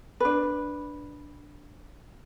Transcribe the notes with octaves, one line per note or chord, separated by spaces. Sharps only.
D4 B4